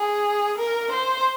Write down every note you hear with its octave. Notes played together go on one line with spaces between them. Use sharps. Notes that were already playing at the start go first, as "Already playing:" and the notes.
Already playing: G#4
A#4
C5